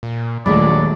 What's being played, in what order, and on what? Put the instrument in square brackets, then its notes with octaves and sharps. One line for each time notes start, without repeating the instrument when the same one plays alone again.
[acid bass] A#2
[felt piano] D#1 A#1 B5 [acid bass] F#3 [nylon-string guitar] G#3 A3 [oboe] D5